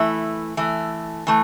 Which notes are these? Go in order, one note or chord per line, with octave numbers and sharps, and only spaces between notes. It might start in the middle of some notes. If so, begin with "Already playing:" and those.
Already playing: E3 A3 E4
E3 A3
E3 A3